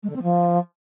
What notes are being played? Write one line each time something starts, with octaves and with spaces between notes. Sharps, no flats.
G#3
D3
C4
F3